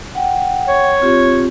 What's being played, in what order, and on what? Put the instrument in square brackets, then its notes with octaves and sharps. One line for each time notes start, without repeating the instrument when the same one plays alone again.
[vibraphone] F#5 G5
[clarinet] C#5
[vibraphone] C4 F4 G4